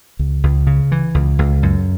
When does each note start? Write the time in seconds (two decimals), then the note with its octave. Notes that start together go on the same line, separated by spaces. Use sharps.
0.19 C#2
0.44 C#2
0.67 C#3
0.92 E3
1.14 C#2
1.39 C#2
1.63 F#2